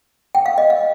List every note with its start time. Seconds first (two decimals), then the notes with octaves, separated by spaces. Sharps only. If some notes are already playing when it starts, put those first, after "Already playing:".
0.35 G5
0.46 F5
0.58 D#5
0.70 F5